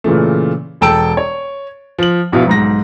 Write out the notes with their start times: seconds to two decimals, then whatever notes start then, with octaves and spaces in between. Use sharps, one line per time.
0.04 A#2 C#3 E3 A3
0.81 E1 A4 G5 A5 E6 D7
1.17 C#5
1.99 F3 F#7
2.32 A#1 B2 E4 F5
2.47 B1 G#2 A#6